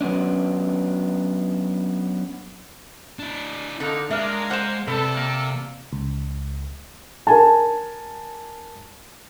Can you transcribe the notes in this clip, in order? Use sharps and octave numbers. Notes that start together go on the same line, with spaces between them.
F#3 B3 C#4 D4
D4 E4
D3 A#3 D#4 A4
G#3 A#3 D4 A#4 E5 F6
C5 F#5 F6 E7
C3 A4 B4 D5
A#3
C#2
A#4 G#5 A5